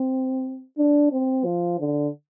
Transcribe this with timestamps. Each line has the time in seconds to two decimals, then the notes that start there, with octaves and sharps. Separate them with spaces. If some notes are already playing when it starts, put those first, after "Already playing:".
Already playing: C4
0.78 D4
1.13 C4
1.45 F3
1.80 D3